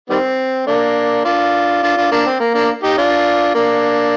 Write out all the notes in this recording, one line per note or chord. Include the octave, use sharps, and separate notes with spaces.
D#3 G3 C4
A#3 D4
D4 F4
D4 F4
D4 F4
A#3 D4
C4
A#3
A#3 D4
D#4 G4
D4 F4
A#3 D4